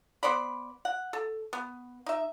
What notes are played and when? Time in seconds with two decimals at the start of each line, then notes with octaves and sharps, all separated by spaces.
0.23 B3 C5 D5 B5
0.85 F#5
1.13 A4
1.53 B3
2.06 D#4 E5